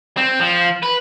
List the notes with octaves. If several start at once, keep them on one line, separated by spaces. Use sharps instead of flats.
C4
F3
B4